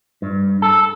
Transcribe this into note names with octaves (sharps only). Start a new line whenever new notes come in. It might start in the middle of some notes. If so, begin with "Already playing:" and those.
G2
A4